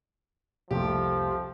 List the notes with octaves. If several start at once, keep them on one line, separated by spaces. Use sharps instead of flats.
C2 F2 F3 A3 G4